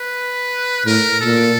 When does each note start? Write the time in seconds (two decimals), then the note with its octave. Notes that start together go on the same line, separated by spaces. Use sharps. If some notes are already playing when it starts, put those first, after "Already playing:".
Already playing: B4
0.86 A2 A#4
1.21 A#2 A4